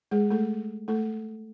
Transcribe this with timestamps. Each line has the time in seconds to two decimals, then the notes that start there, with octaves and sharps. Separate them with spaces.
0.11 G#3 G#4
0.31 A3 A4
0.88 A3 A4